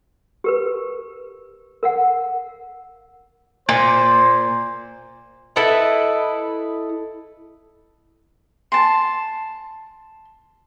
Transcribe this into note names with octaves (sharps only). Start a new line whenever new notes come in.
G4 A#4 B4
A#4 F5 F#5
A#2 C5
E4 A4 B4 D#5
A5 C6